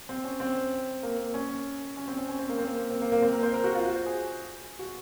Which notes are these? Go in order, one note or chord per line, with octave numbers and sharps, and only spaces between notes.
C4
C#4
C4
A#3
C#4
C#4
C4
C#4
C#4
C4
A#3
C4
A#3
C4
A#3
A#3
C4
A#4
C5
A#4
F#4
F4
F#4
C5
G#4
F#4